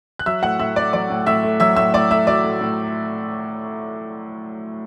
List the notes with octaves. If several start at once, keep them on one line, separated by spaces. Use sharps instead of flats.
F#6
F#3 E5 E6
A2 F#5 F#6
A2 E5 E6
A3 D5 D6
F#3 D5 D6
A2
A2 E5 E6
A3
F#3 E5 E6
A2 E5 E6
A2 D5 D6
A3 E5 E6
F#3 D5 D6
A2
A2